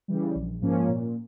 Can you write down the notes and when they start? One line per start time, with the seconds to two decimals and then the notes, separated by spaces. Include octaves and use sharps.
0.08 C#3 E3 G3
0.35 A#1
0.62 G#2 F3 A#3 C#4
0.89 A#2